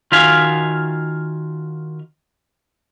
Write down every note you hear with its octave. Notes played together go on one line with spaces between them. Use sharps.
D#3 F4 F#4 E5 F5 G#5